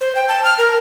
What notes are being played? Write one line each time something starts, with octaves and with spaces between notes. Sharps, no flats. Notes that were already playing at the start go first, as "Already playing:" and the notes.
C5
G5
A5
F6
A#4